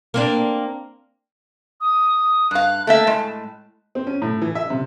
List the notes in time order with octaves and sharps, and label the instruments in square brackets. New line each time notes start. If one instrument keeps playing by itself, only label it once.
[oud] A#3 C4 D4
[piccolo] D#6
[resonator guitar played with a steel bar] G2 F5 [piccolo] F#6
[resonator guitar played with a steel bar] A3 A#3 E5 [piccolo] A5
[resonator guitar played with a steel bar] A2 G#3
[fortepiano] C4
C#4
A2
E3
E5
C3